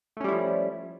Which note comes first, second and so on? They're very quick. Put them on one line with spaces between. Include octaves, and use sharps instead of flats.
A3 C#4 G3 E4 F3